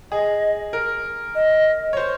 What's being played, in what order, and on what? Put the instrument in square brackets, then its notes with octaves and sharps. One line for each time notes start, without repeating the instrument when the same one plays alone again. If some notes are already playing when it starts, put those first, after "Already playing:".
[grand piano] G#4 [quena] D#5
[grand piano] A#4
[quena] D#5
[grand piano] C#5
C5